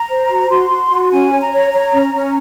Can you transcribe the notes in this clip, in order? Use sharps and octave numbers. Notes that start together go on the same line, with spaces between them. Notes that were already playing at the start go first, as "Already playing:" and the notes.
Already playing: A#5
C5
F#4
F#4 C6
F#4
F#4
C#4 G#5
C#5
A#5
C#5
C#5
C#4
C#4